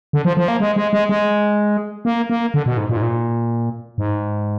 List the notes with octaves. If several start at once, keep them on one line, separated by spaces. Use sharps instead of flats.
D3
F3
F3
A#3
G#3
G#3
G#3
G#3
A#3
A#3
D3
B2
G#2
A#2
G#2
A#2
G#2